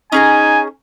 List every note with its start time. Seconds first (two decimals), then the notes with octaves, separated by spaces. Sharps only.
0.12 C#4 D#4 G#4 G#5 A#5